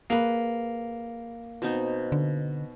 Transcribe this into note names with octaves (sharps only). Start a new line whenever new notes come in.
A#3 G#4 B4
B2 C4 D#4
D3